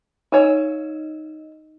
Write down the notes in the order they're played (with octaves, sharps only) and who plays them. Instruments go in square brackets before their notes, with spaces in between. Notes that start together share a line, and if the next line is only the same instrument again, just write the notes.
[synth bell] D#4 D#5 [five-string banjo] C#5 F5 G#5